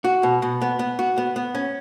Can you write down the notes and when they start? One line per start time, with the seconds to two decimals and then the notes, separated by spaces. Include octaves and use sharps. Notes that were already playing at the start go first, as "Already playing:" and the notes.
0.04 F#4
0.23 B2
0.42 B2
0.62 B3
0.79 B3
0.99 F#4
1.18 B3
1.36 B3
1.55 C#4